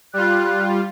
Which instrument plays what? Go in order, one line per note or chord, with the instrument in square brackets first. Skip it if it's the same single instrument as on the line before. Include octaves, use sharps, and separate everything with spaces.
[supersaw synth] G3 F4 [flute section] F#6